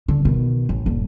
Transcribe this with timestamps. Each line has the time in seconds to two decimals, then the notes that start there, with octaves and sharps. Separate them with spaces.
0.08 D3
0.25 B2 D#3
0.69 A1
0.86 D#1 G2